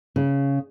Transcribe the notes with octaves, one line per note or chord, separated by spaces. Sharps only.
C#3